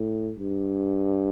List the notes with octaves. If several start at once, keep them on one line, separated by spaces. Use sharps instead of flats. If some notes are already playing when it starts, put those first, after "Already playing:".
Already playing: A2
G2